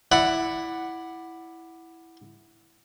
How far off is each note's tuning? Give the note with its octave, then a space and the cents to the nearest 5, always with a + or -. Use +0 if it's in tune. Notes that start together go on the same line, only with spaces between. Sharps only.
E4 +0 D5 +15 F#5 +0